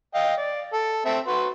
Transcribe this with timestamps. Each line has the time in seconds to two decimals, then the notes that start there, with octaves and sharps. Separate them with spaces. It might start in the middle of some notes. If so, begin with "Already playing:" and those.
0.15 D#5 F5 G5
0.37 D5
0.73 A4
1.05 C4 A4 E5
1.27 F#4 B4 C6